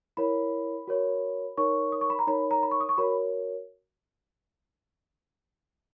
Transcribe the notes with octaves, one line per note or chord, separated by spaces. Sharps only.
E4 A#4 C#5 B5
F#4 A#4 C#5
D#4 A#4 C#5 C#6
D#6
C#6
B5
A#5
D#4 A#4 C#5 B5
A#5
B5
C#6
D#6
C#6
F#4 A#4 C#5 B5